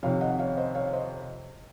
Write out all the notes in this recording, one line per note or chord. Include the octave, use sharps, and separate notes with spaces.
F2 C3 D#3 C#5 F5
D#5 F#5
C#5 F5
C5 D#5
C#5 F5
C5 D#5